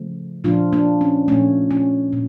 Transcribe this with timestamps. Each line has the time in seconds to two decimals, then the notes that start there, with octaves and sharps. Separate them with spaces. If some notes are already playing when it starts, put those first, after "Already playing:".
Already playing: C#3 F3 A3
0.44 A#2 F3 A#3 D4 F4
0.73 A#3 D4
1.01 C#4
1.28 A#2 F3 A3 C#4
1.71 C#4
2.13 A#2